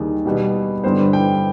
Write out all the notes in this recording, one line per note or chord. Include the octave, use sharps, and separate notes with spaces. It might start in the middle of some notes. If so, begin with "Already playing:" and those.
Already playing: D#2 D#3 G3 G#4
B2 G3 B3
G2 D3 G3 B3 C5
G5